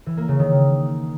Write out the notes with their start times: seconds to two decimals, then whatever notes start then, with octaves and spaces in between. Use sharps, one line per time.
0.06 E3
0.17 A#3
0.28 C#3
0.39 D#3